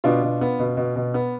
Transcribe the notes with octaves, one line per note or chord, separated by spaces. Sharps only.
B2 D4 F4
B2
B3
B2
B2
B2
B3